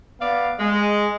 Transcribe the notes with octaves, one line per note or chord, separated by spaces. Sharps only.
B3 D5 F5
G#3